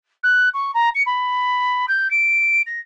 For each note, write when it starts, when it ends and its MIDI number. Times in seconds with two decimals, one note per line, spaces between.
0.23 0.49 90
0.54 0.72 85
0.74 0.90 82
0.95 1.03 97
1.06 1.86 83
1.88 2.10 91
2.11 2.62 98
2.67 2.80 94